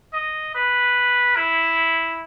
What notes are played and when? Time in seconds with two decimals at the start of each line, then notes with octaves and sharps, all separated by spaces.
0.13 D#5
0.55 B4
1.36 E4